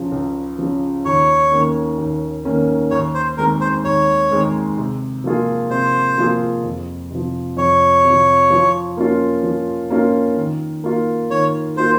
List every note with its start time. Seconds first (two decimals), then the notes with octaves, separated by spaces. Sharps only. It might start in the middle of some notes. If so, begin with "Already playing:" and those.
Already playing: C#2 C#3 F3
0.12 C#2
0.59 C#3 F3
1.05 D#2 C#5
1.51 D#3 A#3 C#4
1.98 D#2
2.45 D#3 A#3 C#4
2.91 D#2 C#5
3.15 C5
3.37 D#3 G#3 C4 A#4
3.61 C5
3.84 D#2 C#5
4.31 D#3 G#3 C4
4.78 C3
5.24 F3 A#3 F4 G#4
5.70 C3 C5
6.18 F3 A#3 F4 G#4
6.64 F2
7.11 C3 F3
7.57 F2 C#5
8.04 C3 F3
8.50 F3
8.97 A#3 C#4 F4
9.43 F3
9.90 A#3 C#4 F4
10.37 D#3
10.84 A#3 F4
11.30 D#3 C#5
11.77 A#3 F4 C5